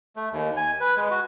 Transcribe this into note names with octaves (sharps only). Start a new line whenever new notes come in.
A3
D#2
G#5
B4
G#3
F#4